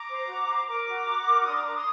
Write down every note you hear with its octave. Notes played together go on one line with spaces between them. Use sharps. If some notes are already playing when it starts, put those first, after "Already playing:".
Already playing: A#5 D6
C5
F#4
C5
A#4 A#5 D6
F#4
F#4
A#4
D4 C6 D#6
A#5 D6
D4 A#5 D6
C6 D#6